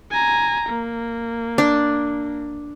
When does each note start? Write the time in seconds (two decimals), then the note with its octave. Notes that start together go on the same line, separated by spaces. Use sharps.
0.11 G#5 A#5
0.69 A#3
1.58 D4